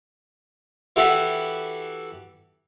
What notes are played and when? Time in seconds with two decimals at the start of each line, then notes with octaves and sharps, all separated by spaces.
0.96 E3 E4 F#4 G4 A4